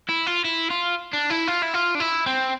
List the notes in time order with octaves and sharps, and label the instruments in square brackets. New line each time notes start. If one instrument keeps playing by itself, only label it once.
[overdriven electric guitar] E4
F4
E4
F4
D4
E4
F4
E4
F4
D4
E4
C4